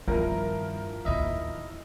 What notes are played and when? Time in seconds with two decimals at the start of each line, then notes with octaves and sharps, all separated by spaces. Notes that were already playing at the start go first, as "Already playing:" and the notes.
0.08 G2 D#3 F3 B3 E4 A#4
1.05 D1 D#2 E4 D#5 E5